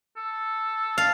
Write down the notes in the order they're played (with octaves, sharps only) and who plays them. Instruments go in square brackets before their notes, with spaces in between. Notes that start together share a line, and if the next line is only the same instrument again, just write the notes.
[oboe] A4
[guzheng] F5 [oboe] A5